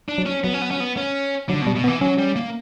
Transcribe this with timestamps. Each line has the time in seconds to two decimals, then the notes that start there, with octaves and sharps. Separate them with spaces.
0.09 D4
0.18 F#3
0.26 C#4
0.44 F#3 B3
0.54 C#4
0.62 B3
0.71 C#4
0.80 B3
0.97 C#4
1.49 D3 F#3
1.62 B2
1.67 G3
1.75 B2
1.84 B3
1.88 E3
2.01 F#3 C#4
2.19 G3
2.36 A#3